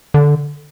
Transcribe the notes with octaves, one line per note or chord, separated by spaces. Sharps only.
D3